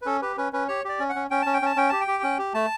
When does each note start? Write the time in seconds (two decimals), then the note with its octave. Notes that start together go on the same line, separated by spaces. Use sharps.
0.02 B4
0.06 C#4 A4
0.21 G4 B4
0.37 C#4 B4
0.53 C#4 B4
0.68 G4 C#5
0.85 G4 D5
0.99 C#4
1.09 F#5
1.15 C#4
1.31 C#4 G5
1.42 C#4 A5
1.54 G5
1.62 C#4 A5
1.76 C#4 G5
1.89 G4 A5
2.01 G5
2.08 G4
2.23 C#4
2.38 G4
2.54 A3 A5